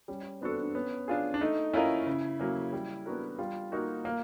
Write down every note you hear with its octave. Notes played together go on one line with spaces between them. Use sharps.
G3 C#4
B3 C4 D4 F#4 A4
D4
B3 C#4
D4 F4 G#4
D4
A3 D#4
C#4 E4 F4 A#4 D#5
C#3
F#3 A#3 C#4
G3
B3 D4 F#4 A#4
G3 F4
A#3 D#4 F#4 A#4
A#3